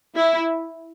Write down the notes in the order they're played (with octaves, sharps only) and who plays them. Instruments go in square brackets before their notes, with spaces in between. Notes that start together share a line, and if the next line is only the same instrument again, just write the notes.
[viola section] E4